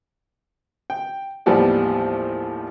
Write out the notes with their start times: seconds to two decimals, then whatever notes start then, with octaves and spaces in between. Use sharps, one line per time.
0.90 G5
1.46 A1 D#2 F3 G3 B3 D5